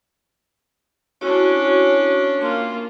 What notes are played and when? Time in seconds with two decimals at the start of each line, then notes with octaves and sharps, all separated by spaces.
1.21 C#4 D4 E4 F#4 C#5
2.41 A#3 F4 C6